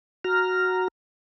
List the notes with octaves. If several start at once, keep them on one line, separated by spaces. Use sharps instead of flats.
F#4 A#5 F6